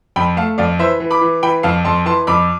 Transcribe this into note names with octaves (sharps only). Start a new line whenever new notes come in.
F2 G5 B5
A3 F5 A5
F2 D5 F5
E3 C5 E5
E3
B5 D6
E3
E3 G5 B5
F2 F5 A5
F2 A5 C6
E3 A5 C6
F2 B5 D6